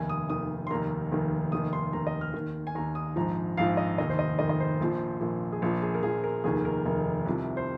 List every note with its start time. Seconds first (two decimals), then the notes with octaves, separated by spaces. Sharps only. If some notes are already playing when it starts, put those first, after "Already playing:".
Already playing: F1 D#2 D#3 G#5
0.09 D#6
0.29 F1 D#2 D#3 D#6
0.67 C6
0.71 F1 D#2 D#3 A#5
1.12 F1 D#2 D#3
1.52 F1 D#2 D#3 D#6
1.73 C6
1.93 F1 D#2 D#3 A#5
2.07 D#5
2.21 F6
2.34 D#2 D#3
2.67 G#5
2.75 D#2 D#3 A#5
2.95 D#6
3.16 A#1 G#2 F3 A#5
3.57 A#1 G#2 F3 F5
3.77 D#5
3.98 F1 D#2 D#3 D#5
4.10 C5
4.19 D#5
4.39 F1 D#2 D#3 D#5
4.49 D#5
4.60 C5
4.81 A#1 A#2 F3
5.21 A#1 A#2 F3
5.52 G#4
5.62 A#1 A#2 F3 A#4
5.82 G#4
5.94 A#4
6.03 A#1 A#2 F3 G#4
6.24 A#4
6.44 F1 D#2 D#3 G#4
6.65 A#4
6.85 F1 D#2 D#3
7.25 C2 C3 F3
7.57 C5